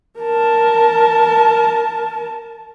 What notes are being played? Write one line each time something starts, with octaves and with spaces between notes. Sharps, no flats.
A#4 A5